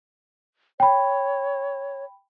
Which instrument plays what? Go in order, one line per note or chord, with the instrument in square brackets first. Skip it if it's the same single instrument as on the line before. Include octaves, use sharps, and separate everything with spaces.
[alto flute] C#5 [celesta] G5 B5